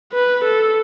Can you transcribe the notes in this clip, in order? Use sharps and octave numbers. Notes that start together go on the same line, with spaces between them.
B4
A4